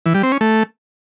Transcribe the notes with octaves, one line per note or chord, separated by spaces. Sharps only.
E3
G3
C4
C#4
A3